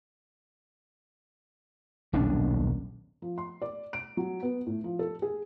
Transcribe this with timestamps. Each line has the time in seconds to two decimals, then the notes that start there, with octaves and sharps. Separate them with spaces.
2.13 D#1 B1 C#4 D4
3.22 F3
3.38 C6
3.62 D5
3.93 D7
4.17 F#3
4.43 B3
4.66 A2
4.84 F3
4.99 A4
5.22 G#4